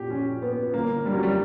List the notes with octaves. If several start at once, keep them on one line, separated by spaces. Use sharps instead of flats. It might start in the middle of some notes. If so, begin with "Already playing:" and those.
Already playing: A#2 G4
A#1 C#4
A#2 B3
G1 A#3
G2 D3 G3
F#3
G3